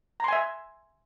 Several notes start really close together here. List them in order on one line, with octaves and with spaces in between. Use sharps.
A#5 C6 G#5 E5